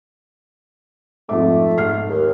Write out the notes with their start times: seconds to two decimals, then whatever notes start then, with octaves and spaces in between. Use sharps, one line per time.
1.29 F2 G#2 A3 D6
1.77 G#2 F6 C7
2.09 D#2